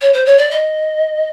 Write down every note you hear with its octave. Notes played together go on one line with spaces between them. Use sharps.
C#5
C5
C#5
D5
D#5